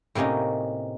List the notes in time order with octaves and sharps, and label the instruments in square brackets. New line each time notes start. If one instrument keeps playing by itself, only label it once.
[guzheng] A2 C3 A#3 C#4 D#4